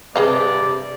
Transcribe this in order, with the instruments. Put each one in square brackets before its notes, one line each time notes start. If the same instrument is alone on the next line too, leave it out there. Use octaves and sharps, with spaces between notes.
[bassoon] G2 [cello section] C3 [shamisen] G#4 D#5 F5 [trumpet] D5